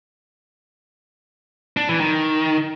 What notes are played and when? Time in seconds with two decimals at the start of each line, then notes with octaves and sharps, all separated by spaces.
1.77 D4
1.89 E3
2.01 D#3